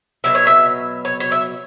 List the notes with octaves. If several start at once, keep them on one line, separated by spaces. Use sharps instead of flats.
B2 F#3 E5
C#5
E5
C#5
C#5
E5